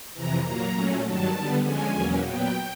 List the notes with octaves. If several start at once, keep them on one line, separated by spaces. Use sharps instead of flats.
F2 C3 E3 A#5
A#2 F#3 A#3 A#5
A#2 F#3 A3 C#4
G2 D#3 F#3 A5
D3 G3 B3
D3 F3 G#3 C#4 G#5
E2 B2 F#3 A#3 C#4
A#2 F#3 B3 G5